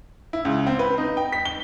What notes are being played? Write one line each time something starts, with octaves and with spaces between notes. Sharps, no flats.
E4
C#2
C4
B4
D#4
G5
B6
G7